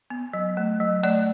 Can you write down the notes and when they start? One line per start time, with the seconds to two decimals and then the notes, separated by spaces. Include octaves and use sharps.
0.10 B3
0.33 F#3
0.57 A3
0.80 F#3
1.04 A3 D5